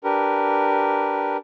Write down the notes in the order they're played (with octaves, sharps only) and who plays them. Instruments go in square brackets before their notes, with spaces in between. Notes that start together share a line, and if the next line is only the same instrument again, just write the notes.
[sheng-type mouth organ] D4 G4 A#4 B4